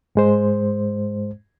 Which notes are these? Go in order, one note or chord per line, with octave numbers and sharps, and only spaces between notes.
G#2 G#3 C5